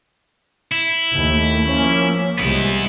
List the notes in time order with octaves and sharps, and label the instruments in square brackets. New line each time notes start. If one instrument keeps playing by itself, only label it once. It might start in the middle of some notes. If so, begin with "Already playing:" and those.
[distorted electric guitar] E4
[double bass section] D#2 A3
F3 A#3 C#4
[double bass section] C2 G#3 [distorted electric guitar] B3 E4